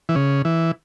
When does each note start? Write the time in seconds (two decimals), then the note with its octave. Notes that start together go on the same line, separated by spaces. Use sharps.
0.09 E3
0.15 C#3
0.45 E3